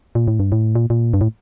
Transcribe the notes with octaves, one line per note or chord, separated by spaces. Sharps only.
A#2
A2
G2
A2
A#2
A#2
G2
A2